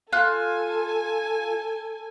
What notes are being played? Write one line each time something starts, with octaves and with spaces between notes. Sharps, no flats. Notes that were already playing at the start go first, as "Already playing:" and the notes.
F4 A4 G#5 F#6